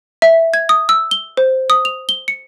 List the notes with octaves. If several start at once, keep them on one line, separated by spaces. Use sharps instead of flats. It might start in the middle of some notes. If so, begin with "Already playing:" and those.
E5
G#6
D#6
E6
G7
C5
D#6
F7
G7
C#7